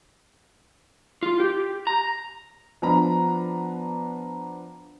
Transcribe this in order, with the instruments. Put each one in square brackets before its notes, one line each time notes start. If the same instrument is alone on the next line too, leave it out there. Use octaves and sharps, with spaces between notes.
[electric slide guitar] F4
G4
A#5
[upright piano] F3 B3 D4 A#5 B5